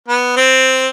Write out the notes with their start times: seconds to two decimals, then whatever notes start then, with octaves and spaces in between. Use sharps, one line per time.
0.08 B3
0.36 C4